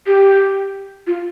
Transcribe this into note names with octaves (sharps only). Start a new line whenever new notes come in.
G4
F4